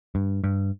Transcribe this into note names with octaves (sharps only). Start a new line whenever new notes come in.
G2
G2